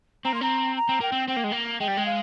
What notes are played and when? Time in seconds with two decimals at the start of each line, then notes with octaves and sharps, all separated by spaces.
0.25 C4 A#5
0.33 A#3 C6
0.41 C4 A#5
0.76 A#5
0.89 C4
1.00 A#3 G5
1.12 C4
1.28 C4 G5
1.36 A#3
1.44 G#3
1.52 A#3
1.80 G#3 G5
1.88 G3
1.97 G#3
2.06 F5